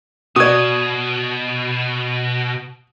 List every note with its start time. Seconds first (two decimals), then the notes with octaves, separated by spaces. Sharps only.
0.36 B2 F#4 D5 D#6 G#6